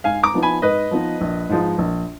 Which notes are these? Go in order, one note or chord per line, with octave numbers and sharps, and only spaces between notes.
G#2 F5 G#5
A#5 D6
F3 B3 D#4
G#5 B5
G#2 B4 D#5
F3 B3 D#4
A#1
G#2 F3 G#3 D#4
A#1